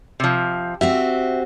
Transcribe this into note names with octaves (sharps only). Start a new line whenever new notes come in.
C3 F3
C4 F#4 G4 E5